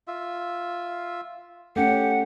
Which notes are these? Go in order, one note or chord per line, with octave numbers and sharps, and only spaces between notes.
F4 E5
A3 C#4 G4 F#5